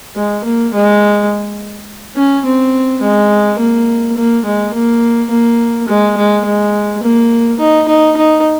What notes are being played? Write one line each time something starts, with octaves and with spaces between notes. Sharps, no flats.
G#3
A#3
G#3
C#4
C4
G#3
A#3
A#3
G#3
A#3
A#3
G#3
G#3
G#3
A#3
D#4
D#4
D#4